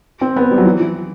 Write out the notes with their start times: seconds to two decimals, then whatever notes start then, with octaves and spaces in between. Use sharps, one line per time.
0.21 C4
0.36 B3
0.51 G3
0.58 F#3
0.65 E3
0.80 E3